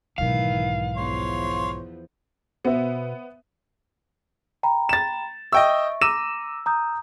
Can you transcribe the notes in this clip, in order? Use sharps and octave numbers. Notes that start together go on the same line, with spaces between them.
B1 G#2 D#3 E3 F5
E2 F3 C#5 C6
B2 B3 C5 E5
G5 A#5 B5
A6 E7
D#5 E5 G5 C#6 E6
A#5 D6 E6 A#6 D#7 E7
A#5 D#6 G6